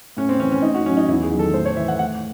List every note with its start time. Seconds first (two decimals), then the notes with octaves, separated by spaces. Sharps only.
0.17 A2 C#4
0.29 C4
0.39 E3 C#4
0.52 C#4
0.62 A2 D#4
0.74 F#4
0.85 F#3 C#4
0.97 D#4
1.08 E2 E4
1.23 G#4
1.31 D#3 F#3
1.39 A4
1.53 A2 C5
1.65 C#5
1.77 E3 E5
1.88 F#5
1.99 A2 F#5